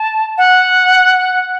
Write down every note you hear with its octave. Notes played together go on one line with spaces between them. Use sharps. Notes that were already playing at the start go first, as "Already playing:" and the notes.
Already playing: A5
F#5